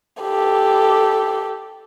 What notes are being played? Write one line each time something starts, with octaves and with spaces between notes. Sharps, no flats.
G4 A4